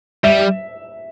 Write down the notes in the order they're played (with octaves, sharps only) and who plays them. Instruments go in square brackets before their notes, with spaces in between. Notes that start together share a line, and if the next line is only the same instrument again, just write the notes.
[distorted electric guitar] G3 [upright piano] E5